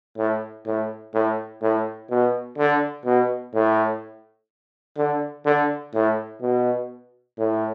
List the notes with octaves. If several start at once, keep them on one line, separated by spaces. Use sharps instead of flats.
A2
A2
A2
A2
B2
D3
B2
A2
D3
D3
A2
B2
A2